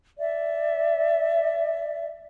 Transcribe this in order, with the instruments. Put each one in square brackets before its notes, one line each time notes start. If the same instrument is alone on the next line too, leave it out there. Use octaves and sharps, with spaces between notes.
[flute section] D5 E5